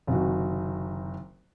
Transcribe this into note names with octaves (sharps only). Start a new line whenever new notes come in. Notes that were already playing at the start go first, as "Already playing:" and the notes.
F#1 C3 D#3 F#4